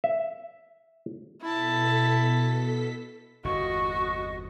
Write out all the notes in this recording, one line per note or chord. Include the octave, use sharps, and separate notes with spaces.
E5
B2 E4 A4 A5 B6
G1 E2 C3 F#4 D#5 C#6